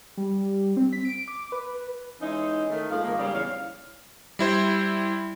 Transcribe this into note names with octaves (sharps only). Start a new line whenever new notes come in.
G3
C4
B6
D7
D6
B4
E3 G#3 C#4 D#4
D#3 A3
G#2 F3 A3 A#3 F5
G#2 D#3 A#3
G#2 C#3 G3
E2 C#3 C#5 F5
G3 E4 C5